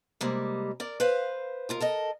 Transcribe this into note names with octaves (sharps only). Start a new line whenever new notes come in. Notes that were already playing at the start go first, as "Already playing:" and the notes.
C3 G3 G#3 A#3
A#4 D5
B4 C5 F5
D#2 F4 A#4
A4 A#4 D#5